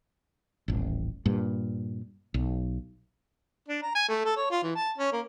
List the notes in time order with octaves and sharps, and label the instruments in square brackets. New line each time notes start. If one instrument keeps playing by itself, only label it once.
[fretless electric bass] D#1 A1
G2 A#2
B1
[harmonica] D4
A#5
G#5
A3
A4
C#5
F4
E3
A5
C#4
A#3